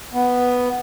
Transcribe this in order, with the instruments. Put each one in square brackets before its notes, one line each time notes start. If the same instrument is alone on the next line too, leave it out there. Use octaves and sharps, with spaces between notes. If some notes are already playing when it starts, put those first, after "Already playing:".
[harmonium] B3